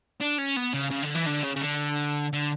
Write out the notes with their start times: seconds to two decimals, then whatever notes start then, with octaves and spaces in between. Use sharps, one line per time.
0.20 D4
0.38 C#4
0.56 B3
0.74 C#3
0.91 C#3
1.03 D3
1.15 E3
1.27 D3
1.44 C#3
1.56 C#3
1.62 D3
2.33 D3